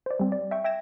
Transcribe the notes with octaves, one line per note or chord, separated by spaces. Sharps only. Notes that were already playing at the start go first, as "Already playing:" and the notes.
C5 D5
G3 C4
D5
E5 G5 C#6
E5 G5 G#6 A#6 E7